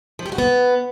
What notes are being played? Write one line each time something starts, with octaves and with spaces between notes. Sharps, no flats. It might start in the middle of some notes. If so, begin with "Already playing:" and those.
F3
G4
F#4
B3